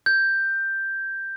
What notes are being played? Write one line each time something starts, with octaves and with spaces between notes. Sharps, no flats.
G6